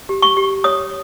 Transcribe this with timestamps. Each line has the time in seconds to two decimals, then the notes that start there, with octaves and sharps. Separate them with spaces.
0.09 G4
0.22 C#6
0.37 G4
0.64 C#5 D#6